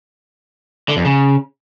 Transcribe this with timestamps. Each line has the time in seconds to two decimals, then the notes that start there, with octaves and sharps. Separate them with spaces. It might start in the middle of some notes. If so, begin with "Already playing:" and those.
0.89 D3
0.97 F2
1.05 C#3